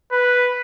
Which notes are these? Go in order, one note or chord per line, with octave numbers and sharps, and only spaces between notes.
B4